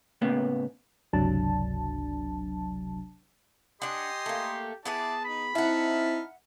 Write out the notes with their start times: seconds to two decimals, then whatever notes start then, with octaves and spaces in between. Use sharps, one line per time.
0.21 A2 C#3 A#3 B3
1.13 G1 C#2 C3 F#3 D4 A5
3.82 D4 G4 D#5 F#5 G#5 C6
4.26 A3 A#3
4.85 B3 E4 G#4 B4 D5 A5
5.25 D#4 B5
5.55 C4 D#4 E4 E5 F#5 A5 F6